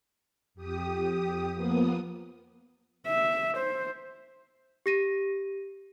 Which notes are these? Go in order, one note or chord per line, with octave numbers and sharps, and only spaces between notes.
F2 G4 D#6
F3 A#3 B3 D#6
E5
C5
G4 A#6 D#7